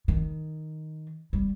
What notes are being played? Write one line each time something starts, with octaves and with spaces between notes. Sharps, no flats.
D#3
G3